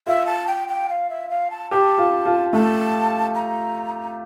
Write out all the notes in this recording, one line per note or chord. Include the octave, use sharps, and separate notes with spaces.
F4 E5
A5
G5
G5
F5
E5
F5
A5
G4 A5
F4
F4
A3 A5
A#5